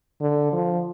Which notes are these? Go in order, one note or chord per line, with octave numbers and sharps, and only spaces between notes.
D3
F3